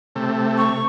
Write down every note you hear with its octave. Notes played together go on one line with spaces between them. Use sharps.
C3 A3
C#6